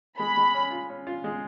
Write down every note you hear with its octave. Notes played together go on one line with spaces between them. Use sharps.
G#3 B5
G#3
C#4
F4
C#4
F4
G#3